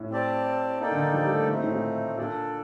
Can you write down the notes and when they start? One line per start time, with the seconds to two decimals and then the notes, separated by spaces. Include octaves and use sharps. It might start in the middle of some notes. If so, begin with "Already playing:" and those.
Already playing: A2
0.10 C4 G4 D5 A5
0.80 A#3 D#4 A4 D5 G5
0.91 D3
1.03 D#3
1.14 F3
1.23 G3
1.31 A3
1.48 D#3 A3 C4 D#4
1.60 A2
1.72 A#2
2.18 A#2 D4 A4 D5